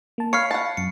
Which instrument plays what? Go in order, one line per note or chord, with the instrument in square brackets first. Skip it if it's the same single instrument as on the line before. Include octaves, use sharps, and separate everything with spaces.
[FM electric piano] A#3 A5
[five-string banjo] C#5 [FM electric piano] F5 B5 C#6 [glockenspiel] F6 C7 C#7
[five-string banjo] F#5 A5
[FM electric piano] F#2 [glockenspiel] C#7